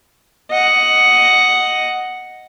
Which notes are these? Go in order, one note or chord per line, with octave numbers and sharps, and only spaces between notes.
D#5 F#5